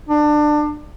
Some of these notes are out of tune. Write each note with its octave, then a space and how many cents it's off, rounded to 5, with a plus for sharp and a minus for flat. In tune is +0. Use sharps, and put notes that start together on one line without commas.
D4 +25